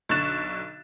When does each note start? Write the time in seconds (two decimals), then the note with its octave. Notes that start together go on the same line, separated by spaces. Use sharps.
0.09 B1 D3 C#6 F#6 A6 E7